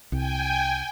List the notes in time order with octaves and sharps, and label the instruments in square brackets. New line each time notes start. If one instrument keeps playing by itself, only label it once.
[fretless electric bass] C2 [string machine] G5 G#5